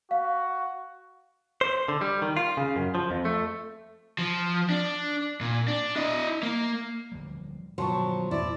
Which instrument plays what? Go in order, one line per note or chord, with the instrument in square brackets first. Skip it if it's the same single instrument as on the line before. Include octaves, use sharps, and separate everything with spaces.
[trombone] F#4 [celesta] F5
[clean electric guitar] C5
D3
G3
D#3
F4
C#3
F#2
F3
F2
A3
[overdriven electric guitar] F3
D4
A#2
D4
E4 D#5
A#3
[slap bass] D1 F3 G3
[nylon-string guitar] G2 F3 F#3 [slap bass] B2 D#3 [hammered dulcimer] C5 A5 C#6
[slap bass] E2 A#2 [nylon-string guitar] E4 [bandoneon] D5